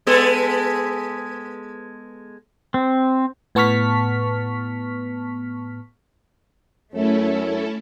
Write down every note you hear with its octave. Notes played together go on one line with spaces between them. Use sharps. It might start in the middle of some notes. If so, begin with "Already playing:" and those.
G#3 B3 A4
C4
A2 B3 A5 C#6 F6 B6
F#2 A3 C#4 E4 A4